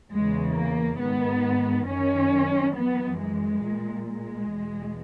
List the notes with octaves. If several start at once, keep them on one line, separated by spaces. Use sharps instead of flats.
E2 C#3 E3 G#3
A#3
G#2 D#3 B3
F#2 D#3 C#4
F#2 E3 B3
G#3
A#2
G#3
E2 B2